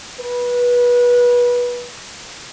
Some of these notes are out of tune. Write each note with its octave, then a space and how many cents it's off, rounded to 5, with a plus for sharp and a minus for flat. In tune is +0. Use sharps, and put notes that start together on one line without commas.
B4 -25